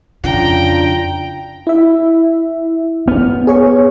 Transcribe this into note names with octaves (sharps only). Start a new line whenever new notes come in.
F2 C#3 D4 F4 G5 A#5
E4 E5
B3 F6
G#4 C#5 C#6